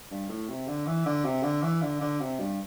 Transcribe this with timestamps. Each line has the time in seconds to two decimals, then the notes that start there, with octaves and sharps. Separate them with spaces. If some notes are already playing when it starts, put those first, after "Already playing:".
0.11 G2
0.29 A2
0.49 C3
0.68 D3
0.87 E3
1.05 D3
1.24 C3
1.43 D3
1.63 E3
1.82 D3
2.01 D3
2.20 C3
2.40 G2